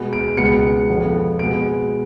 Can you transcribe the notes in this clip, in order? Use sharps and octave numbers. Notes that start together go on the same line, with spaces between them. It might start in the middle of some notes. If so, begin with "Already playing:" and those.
Already playing: B2 G#3 B3
D7
C#2 B2 G#3 B3 C#7
F2 F3 B3
B2 G#3 B3 D7